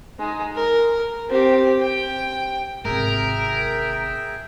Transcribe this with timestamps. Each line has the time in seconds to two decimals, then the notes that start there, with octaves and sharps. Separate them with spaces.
0.19 G#3 D#4
0.55 A#4
1.29 C4 G4
1.82 G5
2.85 G#1 C3 G#4 A#4 E5 G5